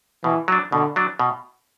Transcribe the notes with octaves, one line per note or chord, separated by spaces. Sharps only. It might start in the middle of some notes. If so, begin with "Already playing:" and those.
B2 E3
F#3 D4
B2 D3
F#3 D4
B2